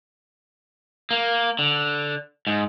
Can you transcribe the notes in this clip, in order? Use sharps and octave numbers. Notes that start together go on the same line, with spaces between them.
A#3
D3
G#2